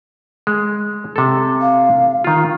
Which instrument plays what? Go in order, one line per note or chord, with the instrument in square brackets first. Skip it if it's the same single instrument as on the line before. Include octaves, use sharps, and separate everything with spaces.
[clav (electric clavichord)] G#3
C3 A4
[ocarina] F5
[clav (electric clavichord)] D#3 F4